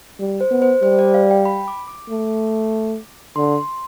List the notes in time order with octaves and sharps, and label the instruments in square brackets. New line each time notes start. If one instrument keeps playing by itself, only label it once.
[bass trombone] G3
[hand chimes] C5
[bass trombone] B3
[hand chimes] C5
[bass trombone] G3 [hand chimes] C5
[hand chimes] D5
F5
G5
B5
D6
D6
[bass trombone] A3
[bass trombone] D3 [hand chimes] C6